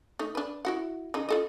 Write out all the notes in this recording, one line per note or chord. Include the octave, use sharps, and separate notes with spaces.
A3 D#4
D4 B4
E4 F#4 F#5
C#3 D#4
F4 A4 D#5